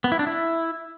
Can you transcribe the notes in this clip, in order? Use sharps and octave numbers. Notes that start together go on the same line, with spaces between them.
B3
E4
D4
E4